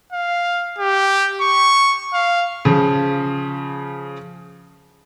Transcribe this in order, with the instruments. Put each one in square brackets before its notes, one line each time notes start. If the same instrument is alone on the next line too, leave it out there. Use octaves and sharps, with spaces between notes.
[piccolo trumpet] F5
G4
C#6
F5
[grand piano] C#3 F3